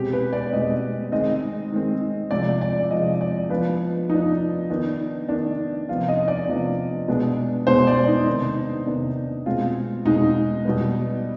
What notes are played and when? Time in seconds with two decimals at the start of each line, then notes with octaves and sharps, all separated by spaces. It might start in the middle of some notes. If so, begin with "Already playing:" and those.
Already playing: B2 G#3 C4 G4
0.13 B4
0.33 D5
0.52 B2 G#3 C4 D#5
1.12 D#3 G#3 C4 D#5
1.72 D#3 G#3 C4
2.31 C3 F3 G#3 D5
2.61 D5
2.91 C3 F3 G#3 D#5
3.21 D5
3.50 F3 B3 D4 B4
4.09 F3 B3 D4 D#4
4.70 D#3 B3 D4
5.29 D#3 B3 D4
5.88 C3 F3 B3 D4 F4
6.08 D#5
6.28 D5
6.48 C3 F3 B3 D4
7.08 B2 G#3 B3 D4
7.67 B2 G#3 B3 D4 C5
7.87 D5
8.07 D#4
8.26 C3 D#3 B3 D4
8.86 C3 D#3 B3 D4
9.46 B2 G#3 C4 F4
10.06 B2 G#3 C4 D#4
10.65 B2 G3 B3